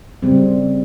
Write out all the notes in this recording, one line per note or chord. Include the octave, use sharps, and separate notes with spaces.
C#3 G3 C4